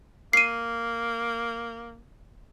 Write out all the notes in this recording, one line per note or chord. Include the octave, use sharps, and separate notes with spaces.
A#3 C7 D#7